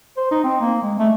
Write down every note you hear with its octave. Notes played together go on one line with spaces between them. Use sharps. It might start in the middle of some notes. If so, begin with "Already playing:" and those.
C5
D#4
C4
A#3
G#3
A3